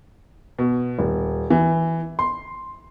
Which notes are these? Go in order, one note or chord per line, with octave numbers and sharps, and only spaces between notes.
B2
D#1
E3
C6